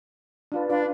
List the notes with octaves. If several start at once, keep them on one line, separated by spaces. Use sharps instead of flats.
D4 F4 B4
D4 F4 B4 D5